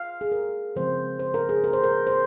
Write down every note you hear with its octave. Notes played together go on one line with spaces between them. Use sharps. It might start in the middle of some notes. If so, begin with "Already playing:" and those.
Already playing: F5
G#4
A#4
C#3 F3 G#3 C4 C5
C5
A#4
G#4
A#4
C5
A#4
C5